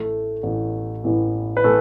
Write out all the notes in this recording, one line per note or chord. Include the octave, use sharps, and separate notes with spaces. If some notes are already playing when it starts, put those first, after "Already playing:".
Already playing: A1 A2 E3 A3 A4
A1 A2 E3
A1 A2 E3
B4
A2 E3 A3 A4